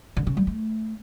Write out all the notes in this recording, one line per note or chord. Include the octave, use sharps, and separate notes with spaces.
D3
C#3
G3
A3